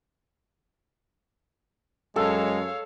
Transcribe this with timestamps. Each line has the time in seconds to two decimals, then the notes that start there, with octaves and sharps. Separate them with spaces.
2.16 F#2 G#3 A4 C#5 F5